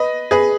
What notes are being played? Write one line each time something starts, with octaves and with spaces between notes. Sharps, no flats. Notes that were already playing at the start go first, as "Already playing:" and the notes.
Already playing: B4 D#5
G#4 B4